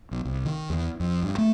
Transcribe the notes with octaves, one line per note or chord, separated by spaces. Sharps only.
B1
C2
D#3
E2
F2
G2
A3